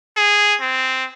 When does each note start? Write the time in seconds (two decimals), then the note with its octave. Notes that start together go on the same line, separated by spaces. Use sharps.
0.17 G#4
0.61 C4